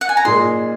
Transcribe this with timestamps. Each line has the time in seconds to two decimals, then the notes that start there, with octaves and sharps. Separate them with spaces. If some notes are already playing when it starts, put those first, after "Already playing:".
0.01 F#5
0.09 G#5
0.17 A#5
0.25 A#2 G#3 D#4 G#4 C6